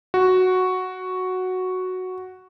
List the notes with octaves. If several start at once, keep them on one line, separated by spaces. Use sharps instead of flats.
F#4